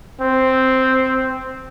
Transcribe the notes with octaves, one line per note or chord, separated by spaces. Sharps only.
C4